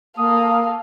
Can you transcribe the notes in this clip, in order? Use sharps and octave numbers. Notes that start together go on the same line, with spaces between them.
A#3 A4 F5 D#6